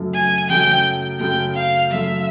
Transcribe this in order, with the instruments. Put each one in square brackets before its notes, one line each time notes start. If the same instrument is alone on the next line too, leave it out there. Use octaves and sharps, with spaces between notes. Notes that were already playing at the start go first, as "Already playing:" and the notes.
Already playing: [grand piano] F#2 C#3 F#3 A3
[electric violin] G#5
[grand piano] F#2 C#3 F#3 A3 [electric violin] G5
[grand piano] F#2 C#3 F#3 A3 [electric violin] G5
[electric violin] F5
[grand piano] F#2 C#3 F#3 A3 [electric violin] E5